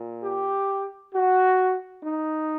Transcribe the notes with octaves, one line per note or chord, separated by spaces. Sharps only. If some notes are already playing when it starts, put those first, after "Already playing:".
Already playing: A#2
G4
F#4
D#4